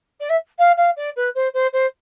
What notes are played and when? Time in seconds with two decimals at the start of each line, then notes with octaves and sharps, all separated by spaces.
0.20 D5
0.29 E5
0.58 F5
0.77 F5
0.96 D5
1.16 B4
1.35 C5
1.53 C5
1.73 C5